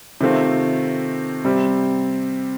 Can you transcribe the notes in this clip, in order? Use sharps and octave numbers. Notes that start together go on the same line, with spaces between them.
C3 D#3 A3 C4 F4
C3 G3 C4